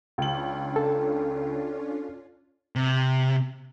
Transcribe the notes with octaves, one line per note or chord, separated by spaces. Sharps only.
C#2 C#4 D4 F4 F#7
A4
C3